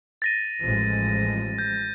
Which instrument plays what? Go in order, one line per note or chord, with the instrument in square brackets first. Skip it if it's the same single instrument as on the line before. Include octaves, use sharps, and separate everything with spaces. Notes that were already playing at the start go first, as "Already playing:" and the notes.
[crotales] A6 A#6 D#7
[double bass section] A1 F3 G#3
[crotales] G6